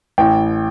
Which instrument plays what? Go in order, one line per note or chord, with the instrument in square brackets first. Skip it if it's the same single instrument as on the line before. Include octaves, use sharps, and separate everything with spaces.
[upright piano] A1 G5